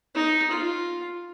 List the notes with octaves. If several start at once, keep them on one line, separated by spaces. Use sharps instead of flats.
D#4
F4